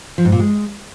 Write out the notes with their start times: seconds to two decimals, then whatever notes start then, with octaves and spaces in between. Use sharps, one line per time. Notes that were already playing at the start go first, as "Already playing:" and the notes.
0.18 F3
0.25 G#2
0.32 A#2
0.39 G#3